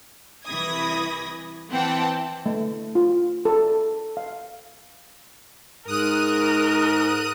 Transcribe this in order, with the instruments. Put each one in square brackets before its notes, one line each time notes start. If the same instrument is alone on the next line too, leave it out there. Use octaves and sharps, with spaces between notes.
[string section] C2 E3 B5 D#6 G#6 A#6
E3 C4 F#5 G5 A5
[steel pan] A3
F4
A4
F5
[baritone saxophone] G#2 [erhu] A#4 [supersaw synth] D#6 F#6 D#7